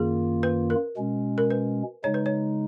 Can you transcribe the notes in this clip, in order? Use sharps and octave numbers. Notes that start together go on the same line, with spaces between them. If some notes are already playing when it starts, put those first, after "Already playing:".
Already playing: F#2 D#3 A#3 F4 G#4
B4
A#4
B2 G#3 C#4
A#4
B4
C#3 G#3 D#4 C#5
B4
C#5